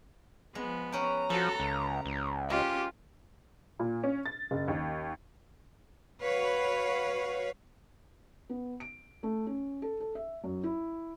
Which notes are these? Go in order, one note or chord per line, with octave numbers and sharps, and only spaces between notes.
F3 G#3 B3
C#4 F#5 G5 A#5
F3 F#4 A4 B4
C#2 C#3
C#2
G#3 C#4 F4 G4
A#2
C#4
A6
F#1
D#2
F#4 B4 C#5 F5
B3
D7
A3
C#4
A4
A4
E5
F#2
E4